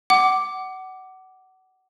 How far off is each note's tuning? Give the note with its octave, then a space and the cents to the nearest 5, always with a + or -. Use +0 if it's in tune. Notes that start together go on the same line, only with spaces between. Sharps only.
F#5 +25 D6 +0